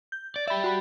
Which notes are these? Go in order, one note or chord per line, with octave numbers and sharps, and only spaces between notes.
G6
D5
G4 D5 E5 B5
F#4 B5